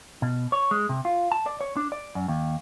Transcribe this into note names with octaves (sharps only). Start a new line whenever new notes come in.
B2
C#5
G#3
C3
F4
A5
D5
C#5
D4
D5
F#2
D#2